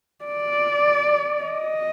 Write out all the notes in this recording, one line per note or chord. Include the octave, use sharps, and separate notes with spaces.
D5
D#5